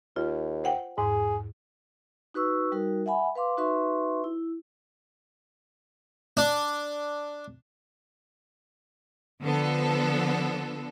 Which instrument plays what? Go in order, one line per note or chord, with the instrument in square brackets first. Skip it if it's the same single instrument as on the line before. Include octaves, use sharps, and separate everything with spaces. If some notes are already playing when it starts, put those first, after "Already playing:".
[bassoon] D#2 [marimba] F4
[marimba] C5 F#5 G5
[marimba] E2 G#2 [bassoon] G#4
[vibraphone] D#4 F#4 B4 C#6 E6
G3 D#4 F#4 A#4
E5 F#5 G#5 B5
B4 F5 C6 D6
D#4 F#4 B4 E5 C6 C#6
E4
[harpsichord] D4
[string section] D3 F3 B3 A4